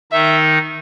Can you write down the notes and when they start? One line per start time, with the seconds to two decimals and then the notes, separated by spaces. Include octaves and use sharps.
0.12 D#3 D#4 E5